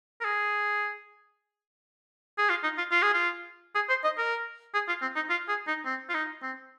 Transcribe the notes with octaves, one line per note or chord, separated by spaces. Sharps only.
A#4
G#4
G#4
F4
D#4
F4
F4
G#4
F4
G#4
C5
D#5
A#4
G#4
F4
C4
D#4
F4
G#4
D#4
C4
F4
D#4
C4